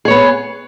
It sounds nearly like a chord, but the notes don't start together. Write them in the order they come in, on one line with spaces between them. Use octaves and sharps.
G#4 C#5 B3